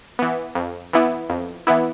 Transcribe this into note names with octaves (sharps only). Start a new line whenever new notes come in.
E3 B3
F2
E3 B3 E4
F2
E3 B3 E4